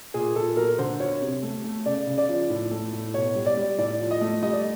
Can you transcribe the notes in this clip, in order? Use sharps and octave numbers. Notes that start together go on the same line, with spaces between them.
A#2 G#4
A#2 A4
F#3 A#4
D3 C5
F#3 C#5
C3
A3
A3
C#3 D5
C#3
D5
F3
A2
A3
A2
B2 C#5
G3
D5
G3
A2 D5
F3
D#5
A3
G3 D#5
D5